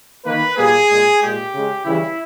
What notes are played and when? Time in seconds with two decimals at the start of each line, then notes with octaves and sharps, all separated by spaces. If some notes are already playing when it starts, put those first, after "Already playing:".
0.25 D#3 A#3 B4
0.56 A#2 G3 A#3 G#4
0.89 A#2 G#3
1.21 A#2 G#3 G4
1.52 C#3 G#3
1.85 C#3 E3 G3 E4